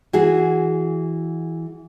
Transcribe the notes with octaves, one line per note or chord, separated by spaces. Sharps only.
E3 F#4 G#4